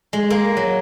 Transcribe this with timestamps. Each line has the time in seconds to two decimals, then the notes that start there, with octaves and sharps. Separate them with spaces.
0.13 G#3
0.30 A#3
0.57 F#3